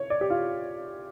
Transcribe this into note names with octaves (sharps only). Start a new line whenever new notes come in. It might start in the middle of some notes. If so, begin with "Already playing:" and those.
Already playing: C#5
D5
G4
F4